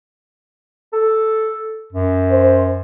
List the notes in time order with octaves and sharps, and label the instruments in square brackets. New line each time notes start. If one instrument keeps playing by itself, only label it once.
[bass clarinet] A4
F#2
[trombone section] C5